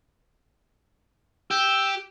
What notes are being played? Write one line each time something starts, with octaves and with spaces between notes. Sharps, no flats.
G4 E6